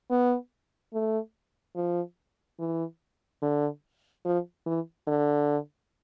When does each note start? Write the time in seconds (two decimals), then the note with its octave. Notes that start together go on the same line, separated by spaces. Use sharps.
0.10 B3
0.94 A3
1.76 F3
2.59 E3
3.42 D3
4.25 F3
4.66 E3
5.08 D3